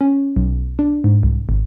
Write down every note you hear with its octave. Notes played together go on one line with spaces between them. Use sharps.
C#4
B1
D4
G#2
C2
G#1